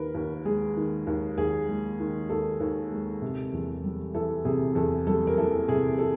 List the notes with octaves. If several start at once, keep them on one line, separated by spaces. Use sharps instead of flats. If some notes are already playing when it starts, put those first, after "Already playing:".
Already playing: D#2 D#3 A#4 B4
D#2
G#3 G#4
D#3
D#2
D#2 G#4
G#3
D#3
D#2 A4
D#2
G#3
C3
E2
G3
E3 A4
C3 G#4
E2 A4
G3 A4
A#4
E3 A4
C3 G#4
A4